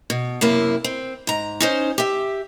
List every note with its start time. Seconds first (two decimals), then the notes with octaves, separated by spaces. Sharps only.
0.10 B2
0.41 F#2 C3 A#3 E4
0.84 C4
1.27 G#2 A#5
1.60 C#4 D#4 C5
1.98 G4 E5